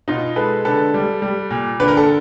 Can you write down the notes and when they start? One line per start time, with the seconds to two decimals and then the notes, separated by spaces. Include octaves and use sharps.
0.08 B2 D#4 F4
0.36 G#3 A4 B4
0.65 D3 A4 B4
0.94 G3
1.22 G3
1.51 A#2
1.80 D3 B4
1.88 A#4
1.97 A4